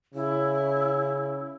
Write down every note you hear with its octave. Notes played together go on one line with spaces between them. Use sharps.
C#3 E4